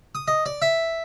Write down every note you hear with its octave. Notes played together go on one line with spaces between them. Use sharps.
D#6
D#5
D5
E5